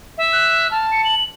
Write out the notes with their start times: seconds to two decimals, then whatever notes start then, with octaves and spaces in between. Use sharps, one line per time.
0.18 E5
0.33 F#6
0.71 A5 F6
0.92 C#7
1.05 F#7